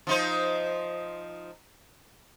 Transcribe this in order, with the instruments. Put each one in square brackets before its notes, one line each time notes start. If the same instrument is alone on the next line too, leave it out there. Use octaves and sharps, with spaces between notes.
[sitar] F3 D#4 C5